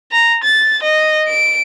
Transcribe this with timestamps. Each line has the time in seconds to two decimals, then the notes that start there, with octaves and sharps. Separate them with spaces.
0.12 A#5
0.44 A6
0.83 D#5
1.28 D7